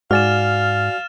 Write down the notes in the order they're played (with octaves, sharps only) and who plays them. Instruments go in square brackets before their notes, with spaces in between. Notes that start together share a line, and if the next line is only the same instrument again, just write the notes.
[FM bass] G#2 [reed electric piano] F#4 D5 G#5 [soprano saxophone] F5 [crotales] F6 A6 E7